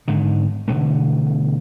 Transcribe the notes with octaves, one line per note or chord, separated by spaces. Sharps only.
G#2 D3 D#3
B2 D3 E3 A3